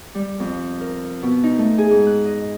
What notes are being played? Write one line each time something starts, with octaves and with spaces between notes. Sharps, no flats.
G3
F2
A#4
B2
D#4
A3
G#4
G#2
F#6
D#5